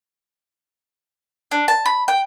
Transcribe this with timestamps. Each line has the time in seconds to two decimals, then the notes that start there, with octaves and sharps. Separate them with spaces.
1.51 D4
1.68 A5
1.86 B5
2.08 G5